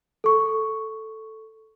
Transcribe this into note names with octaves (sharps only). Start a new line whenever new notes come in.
A4 C#6